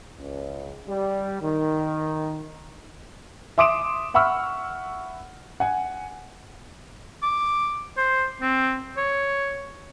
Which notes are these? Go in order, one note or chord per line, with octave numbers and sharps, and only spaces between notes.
C#2
G3
D#3
E5 C6 D6 D#6 D7 E7
E5 F#5 B5 C#6 E6 F6
F#5 G#5
D6
C5
C4
C#5